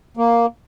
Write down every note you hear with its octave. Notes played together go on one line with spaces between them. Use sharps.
A#3